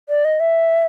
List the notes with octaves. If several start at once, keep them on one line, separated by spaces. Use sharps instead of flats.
D5
D#5
E5